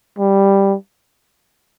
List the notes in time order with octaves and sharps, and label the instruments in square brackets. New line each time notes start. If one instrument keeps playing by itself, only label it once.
[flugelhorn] G3